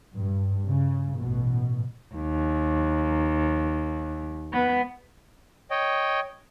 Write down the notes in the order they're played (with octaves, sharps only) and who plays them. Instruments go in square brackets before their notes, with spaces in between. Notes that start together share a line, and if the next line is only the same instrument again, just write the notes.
[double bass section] G2
C#3
A1 B2
[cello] D#2
B3
[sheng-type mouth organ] C#5 D#5 G5